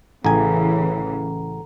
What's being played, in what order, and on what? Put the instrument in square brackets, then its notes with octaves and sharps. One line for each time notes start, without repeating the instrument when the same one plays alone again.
[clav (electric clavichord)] A1 G#5 [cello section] C#3 E3 [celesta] A4 F#5 A#5